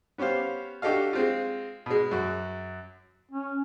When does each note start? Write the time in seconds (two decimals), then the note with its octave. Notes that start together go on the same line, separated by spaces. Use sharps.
0.18 B3 C#4 G4 C5 F5
0.82 D4 F#4 G4 A4 D#5 F5
1.13 G#3 C4 F4
1.86 B2 G#3
2.11 F#2 F#4
3.32 C#4